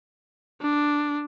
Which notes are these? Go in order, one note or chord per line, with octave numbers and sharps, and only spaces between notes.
D4